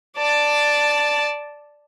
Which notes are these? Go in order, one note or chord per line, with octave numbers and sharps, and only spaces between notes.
D5 A5